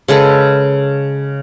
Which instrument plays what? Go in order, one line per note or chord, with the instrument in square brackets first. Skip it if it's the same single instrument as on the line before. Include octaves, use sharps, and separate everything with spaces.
[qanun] C#3 G#3 A4 B4